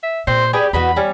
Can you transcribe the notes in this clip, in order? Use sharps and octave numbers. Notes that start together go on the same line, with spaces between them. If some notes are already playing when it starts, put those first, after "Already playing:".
E5
A#2 C4 C5
G4 G#4 B4 D5
E2 F#4 B4 D#5 B5
G3 C#4